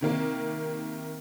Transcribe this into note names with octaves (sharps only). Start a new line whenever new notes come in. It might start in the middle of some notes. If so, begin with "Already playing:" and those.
C3 D#3 A#3